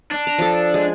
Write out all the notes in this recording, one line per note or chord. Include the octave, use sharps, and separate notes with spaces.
D4
A#5
F3 A4
G#3